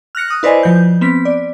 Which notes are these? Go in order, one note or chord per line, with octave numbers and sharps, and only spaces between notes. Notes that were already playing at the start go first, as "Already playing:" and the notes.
F6 F#6 A#6 C#7
D#6 F#6
E4 B4 C5 D5 D#5 G#5
F3 G6
B3 C4 B6
D5